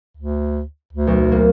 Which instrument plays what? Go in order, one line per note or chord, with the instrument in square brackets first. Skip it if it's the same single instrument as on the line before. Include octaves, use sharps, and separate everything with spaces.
[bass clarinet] D2
D2
[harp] B1
A#3